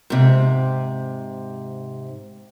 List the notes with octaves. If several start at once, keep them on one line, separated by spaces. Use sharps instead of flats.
G#2 C3